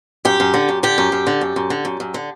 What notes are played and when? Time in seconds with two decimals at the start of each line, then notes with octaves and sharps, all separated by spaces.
0.25 F#2 G4
0.40 F#2
0.54 D3
0.69 F#2
0.83 D3 G4
0.98 F#2
1.12 F#2
1.27 D3
1.41 F#2
1.56 F#2
1.70 D3
1.85 F#2
2.00 F#2
2.14 D3